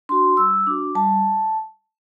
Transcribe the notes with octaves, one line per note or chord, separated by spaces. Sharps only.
D4 F#4 C6
G3 E6
D4 F#4 D6
G3 A5